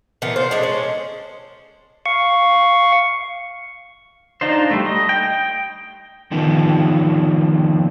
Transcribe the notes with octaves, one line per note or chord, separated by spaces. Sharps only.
A#2 E3 B3
C5
G#3 D4
C#4
F5 C#6
D4 D#4 F4 C5
G3 A3
D#5
G5
D3 D#3 F3 B3